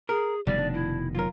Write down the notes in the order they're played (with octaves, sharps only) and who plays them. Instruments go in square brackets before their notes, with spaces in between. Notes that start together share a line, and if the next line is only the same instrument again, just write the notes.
[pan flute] G#4 [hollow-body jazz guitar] A#4
[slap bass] F1 B2 D#3 [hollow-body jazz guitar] G3 [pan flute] D5
[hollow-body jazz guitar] D4
[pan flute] E4
[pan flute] F#3 [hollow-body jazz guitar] F4 A#4